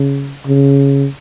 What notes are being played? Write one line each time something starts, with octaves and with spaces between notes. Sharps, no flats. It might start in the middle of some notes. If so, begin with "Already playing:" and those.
Already playing: C#3
C#3